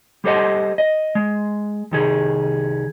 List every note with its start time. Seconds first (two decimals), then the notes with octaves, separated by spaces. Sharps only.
0.24 G3 G4 A4 C5 D#5 F#5
0.78 D#5
1.15 G#3
1.91 C2 D#3 G#4